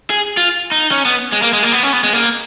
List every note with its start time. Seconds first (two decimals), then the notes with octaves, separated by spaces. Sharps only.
0.10 G#4
0.37 F4
0.71 D#4
0.91 C#4
1.05 B3
1.32 G#3
1.42 A#3
1.53 G#3
1.63 A#3
1.73 B3
1.83 C#4
1.93 B3
2.04 G#3
2.13 A#3